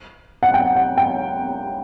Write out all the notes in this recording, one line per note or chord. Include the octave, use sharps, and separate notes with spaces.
F#5
G5
F#5
G5